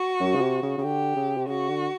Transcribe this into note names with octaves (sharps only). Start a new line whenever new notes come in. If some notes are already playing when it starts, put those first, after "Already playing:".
Already playing: F#4
F#2
C#3
C3
C#3
C#3
D3 G4
C#3
C3
C#3 F#4
D3